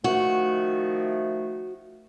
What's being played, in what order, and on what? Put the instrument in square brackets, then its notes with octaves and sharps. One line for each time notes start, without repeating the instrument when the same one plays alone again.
[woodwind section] D#3 F3 A3 [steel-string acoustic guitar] F#4